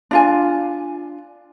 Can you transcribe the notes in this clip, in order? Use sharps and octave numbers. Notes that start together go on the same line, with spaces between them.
D4 F4 G#5